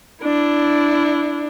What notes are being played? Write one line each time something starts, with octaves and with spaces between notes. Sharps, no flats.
D4 E4